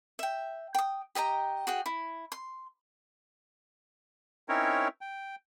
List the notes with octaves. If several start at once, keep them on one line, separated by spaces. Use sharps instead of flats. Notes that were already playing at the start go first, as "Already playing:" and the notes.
E5 G5
G5 D#6
G4 D#5 G5 A#5
F#4 G#4 G5
E4
C6
C4 C#4 D#4 E4 A#4 C#5
G5